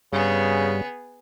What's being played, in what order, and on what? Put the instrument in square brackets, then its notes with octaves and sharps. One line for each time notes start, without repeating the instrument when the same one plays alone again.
[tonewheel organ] G2 G3 [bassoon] C#3 [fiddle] B3 G#4